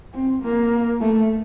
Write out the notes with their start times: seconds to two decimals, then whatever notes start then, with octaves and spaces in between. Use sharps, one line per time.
0.14 C4
0.43 A#3
1.01 A3